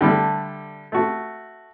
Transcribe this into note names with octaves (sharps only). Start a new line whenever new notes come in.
D3 G3 A3
A3 F#4